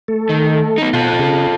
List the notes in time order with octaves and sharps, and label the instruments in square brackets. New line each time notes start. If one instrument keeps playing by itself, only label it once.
[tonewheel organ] A3 A4
[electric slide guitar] D#3
B3 D#4
[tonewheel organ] B2 F#5 [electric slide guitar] F4 A4
[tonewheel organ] C#3 G#4